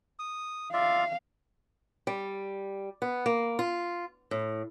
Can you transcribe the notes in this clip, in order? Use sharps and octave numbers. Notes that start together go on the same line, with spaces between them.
D#6
F4 D5 E5 F5
G3
B3
A#3
F4
A2